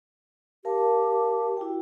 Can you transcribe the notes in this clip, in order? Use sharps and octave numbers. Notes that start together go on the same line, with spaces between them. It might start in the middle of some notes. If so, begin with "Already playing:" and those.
G4 A#4 F5 A5
E4 F#4 G5